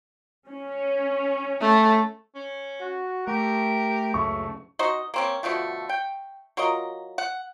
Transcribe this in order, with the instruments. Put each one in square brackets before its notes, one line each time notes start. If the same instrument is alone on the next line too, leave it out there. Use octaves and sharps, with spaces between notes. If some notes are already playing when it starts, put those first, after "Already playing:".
[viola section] C#4
[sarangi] A3
[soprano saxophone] C#4
[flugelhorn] F#4
[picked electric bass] A3 [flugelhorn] G4 [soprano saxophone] A#4
[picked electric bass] C#2 F#2 C#3 [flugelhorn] A3 [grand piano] C#6
[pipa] D#4 F#4 C5 D#5
A#3 C4 C#4
B2 D3 F3 A3
G5
F#3 F4 A#4 D#5
F#5